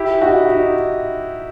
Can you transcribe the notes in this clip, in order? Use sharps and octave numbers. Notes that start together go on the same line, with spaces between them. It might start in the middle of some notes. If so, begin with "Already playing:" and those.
Already playing: E4 G4
D#4 F#4
D#4